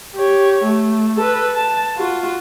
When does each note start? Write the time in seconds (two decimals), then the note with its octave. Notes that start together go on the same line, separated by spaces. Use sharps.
0.15 G4 C#5
0.64 A3
1.17 A4 B4
1.55 A5
1.98 F4 F#4